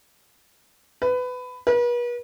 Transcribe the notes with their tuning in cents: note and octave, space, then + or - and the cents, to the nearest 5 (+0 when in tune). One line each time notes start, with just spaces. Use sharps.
B4 +20
B4 -40